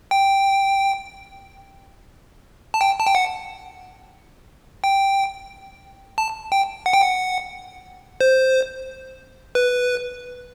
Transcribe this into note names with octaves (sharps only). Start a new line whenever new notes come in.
G5
A5
G5
A5
G5
F#5
G5
A5
G5
F#5
G5
F#5
C5
B4